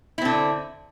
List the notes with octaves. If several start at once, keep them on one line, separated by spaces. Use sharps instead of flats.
D3 C4 E4